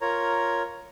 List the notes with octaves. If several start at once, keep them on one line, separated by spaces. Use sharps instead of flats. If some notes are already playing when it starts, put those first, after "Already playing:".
F4 A#4 C#5 A#5